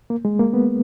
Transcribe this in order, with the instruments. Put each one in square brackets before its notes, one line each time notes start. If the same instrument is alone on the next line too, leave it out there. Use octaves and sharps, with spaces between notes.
[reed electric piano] A#3
G#3
A#3
B3